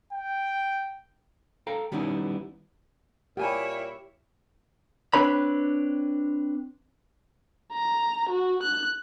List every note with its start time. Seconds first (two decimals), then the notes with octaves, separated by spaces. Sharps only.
0.13 G5
1.67 A4 F5 G5 A#5
1.92 D#3 G3 B3 C#4 D#4 E4
3.37 A#2 E4 G4 C#5 G5 G#5 B5
5.14 C4 D4 B4 C#5 B5
7.72 A#5
8.29 F#4
8.63 F#6